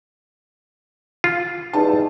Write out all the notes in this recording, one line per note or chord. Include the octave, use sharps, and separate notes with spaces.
F4
E2 G2 D#4 A5